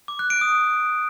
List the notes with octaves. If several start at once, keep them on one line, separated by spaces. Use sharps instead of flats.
D6
F#6
D7
D#6